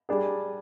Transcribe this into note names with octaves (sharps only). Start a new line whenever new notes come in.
G3 D4 G#4